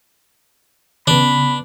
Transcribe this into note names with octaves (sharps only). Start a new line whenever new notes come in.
C#3 B3 D4 B5